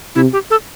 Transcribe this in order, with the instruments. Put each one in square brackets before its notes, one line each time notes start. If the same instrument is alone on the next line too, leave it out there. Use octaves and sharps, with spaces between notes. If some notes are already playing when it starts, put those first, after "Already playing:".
[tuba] C3 [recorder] E4
[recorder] G4
A4